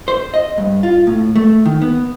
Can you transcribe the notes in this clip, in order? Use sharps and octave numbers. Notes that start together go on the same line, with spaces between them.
C5
D#5
G2
F4
A2
A3
D#3
B3